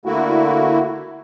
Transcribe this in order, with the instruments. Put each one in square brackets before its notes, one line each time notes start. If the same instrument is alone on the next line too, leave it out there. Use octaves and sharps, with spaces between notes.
[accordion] D3 A3 A#3 E4 F#4